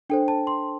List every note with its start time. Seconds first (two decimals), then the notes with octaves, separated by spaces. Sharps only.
0.10 D4 A4 C5 G5
0.28 A5
0.47 C6